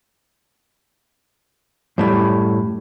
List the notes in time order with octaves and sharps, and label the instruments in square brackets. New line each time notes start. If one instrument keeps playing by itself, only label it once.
[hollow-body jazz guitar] F#2 A2 G3